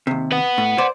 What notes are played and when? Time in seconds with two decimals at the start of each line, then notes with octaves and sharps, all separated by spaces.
0.07 D#2 C3
0.32 B4 F#5
0.58 A2
0.78 C5 D5